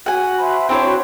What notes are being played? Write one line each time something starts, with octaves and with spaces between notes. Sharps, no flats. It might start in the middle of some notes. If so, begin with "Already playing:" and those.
F#4 F#5 G#5
C5 E5 B5
C4 D4 E4 C5 C#5 B5
F#4